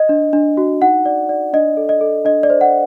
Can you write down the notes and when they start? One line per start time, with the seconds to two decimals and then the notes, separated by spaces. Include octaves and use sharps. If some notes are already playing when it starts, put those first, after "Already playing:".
Already playing: D#5
0.09 D4
0.33 D4
0.57 F#4
0.81 D#4 F#5
1.06 D5
1.29 D5
1.53 D4 D#5
1.77 A4
1.89 D#5
2.01 A4
2.25 D4 D#5
2.43 D5
2.50 C5
2.61 F#5